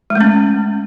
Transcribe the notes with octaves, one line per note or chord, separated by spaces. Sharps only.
G#3
A3
C#4